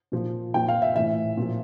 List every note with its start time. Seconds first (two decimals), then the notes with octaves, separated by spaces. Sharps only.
0.12 A#2 F3
0.54 A#2 F3 G5
0.68 F5
0.82 E5
0.96 A2 E3 E5
1.37 A#2 F3